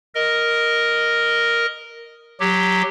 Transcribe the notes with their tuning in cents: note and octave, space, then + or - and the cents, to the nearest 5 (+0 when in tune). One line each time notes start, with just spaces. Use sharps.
A#4 +0 D#5 +0
F#3 +0 G4 +0